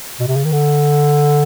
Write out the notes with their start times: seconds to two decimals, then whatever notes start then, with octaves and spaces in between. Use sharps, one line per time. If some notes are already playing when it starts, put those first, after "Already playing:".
0.20 B2
0.27 C3
0.36 C#3
0.44 D#3
0.52 D3